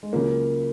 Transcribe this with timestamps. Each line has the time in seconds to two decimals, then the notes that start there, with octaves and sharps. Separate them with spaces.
0.03 G#3
0.13 C#2 C#3 F#3 A#3